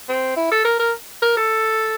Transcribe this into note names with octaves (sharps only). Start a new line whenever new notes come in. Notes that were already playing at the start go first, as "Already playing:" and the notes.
C4
E4
A4
A#4
A#4
A#4
A4